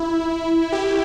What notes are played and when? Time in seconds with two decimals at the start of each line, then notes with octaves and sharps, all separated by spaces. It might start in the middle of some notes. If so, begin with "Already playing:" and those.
Already playing: E4
0.72 G4